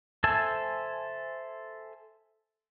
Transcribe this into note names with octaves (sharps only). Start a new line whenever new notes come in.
A4 C5 E5 G#5 A5